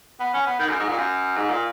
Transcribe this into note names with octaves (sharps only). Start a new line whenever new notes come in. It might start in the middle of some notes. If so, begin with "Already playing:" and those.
B3
C#4
B3
D#3
F#2
G#2
A#2
F#2
G#2
A#2